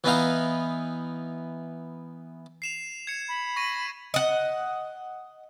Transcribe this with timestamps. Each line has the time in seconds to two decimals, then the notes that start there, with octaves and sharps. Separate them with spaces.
0.04 E3 B3 D#4 F5
2.62 C7 E7 F7
3.07 G#6 C#7
3.28 B5
3.56 C#6 A#6 D#7
4.14 D#5 F#5